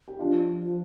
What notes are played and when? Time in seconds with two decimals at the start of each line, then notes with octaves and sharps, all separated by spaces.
0.08 G4
0.19 F3 D4 F4